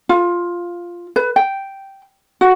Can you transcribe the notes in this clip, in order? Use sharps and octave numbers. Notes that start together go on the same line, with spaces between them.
F4
B4
G5
F#4